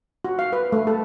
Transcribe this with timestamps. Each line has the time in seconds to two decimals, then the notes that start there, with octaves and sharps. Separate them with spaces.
0.25 F#4
0.39 F5
0.53 B4
0.72 A3
0.87 A4